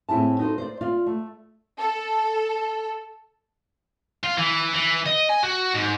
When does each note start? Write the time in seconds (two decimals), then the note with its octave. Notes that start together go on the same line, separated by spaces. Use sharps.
0.09 A2 C4 E4 G#4 A5
0.39 D#4 F#4 G4 A4 C5
0.58 C5 D5
0.81 F4 D5 F5
1.06 A3
1.78 A4
4.24 F4
4.38 E3
4.74 E3
5.06 D#5
5.29 G#5
5.43 F#4
5.74 G#2